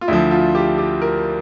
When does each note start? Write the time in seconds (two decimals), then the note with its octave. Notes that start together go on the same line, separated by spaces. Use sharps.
0.01 F4
0.08 D2 D3 F3 E4
0.31 F4
0.55 G4
0.78 G4
1.02 A#4